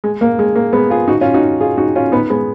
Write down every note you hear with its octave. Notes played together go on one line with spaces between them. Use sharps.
G#3
A#3
G#3
A#3
G#3 B3
F4 G#4
D#4 F#4
C#4 F4
D#4 F#4
F4 G#4
D#4 F#4
C#4 F4
B3 D#4
G#3 B3